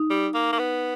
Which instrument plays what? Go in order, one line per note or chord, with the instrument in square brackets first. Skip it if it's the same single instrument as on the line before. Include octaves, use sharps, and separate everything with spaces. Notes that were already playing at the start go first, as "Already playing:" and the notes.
Already playing: [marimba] D#4
[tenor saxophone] G3
A#3
A#3
B3